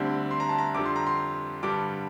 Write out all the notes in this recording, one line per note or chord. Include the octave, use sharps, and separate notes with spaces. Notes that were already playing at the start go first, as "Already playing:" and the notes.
Already playing: D2 D3 G3 C4
C6
A#5
A5
A#5
F2 D3 G3 D6
C6
A#5
C6
G2 D3 G3 D6